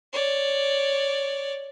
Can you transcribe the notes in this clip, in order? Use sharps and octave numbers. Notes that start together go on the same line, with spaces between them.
C#5 D5